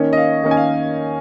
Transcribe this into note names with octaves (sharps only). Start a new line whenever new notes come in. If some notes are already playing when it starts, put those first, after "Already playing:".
Already playing: D#3 A#3 C#4 C#5
D#5
F5
D#3 A#3 C#4
G#5
F5